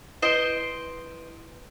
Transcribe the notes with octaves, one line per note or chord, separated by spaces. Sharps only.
E4 B4 C5 D#5 D7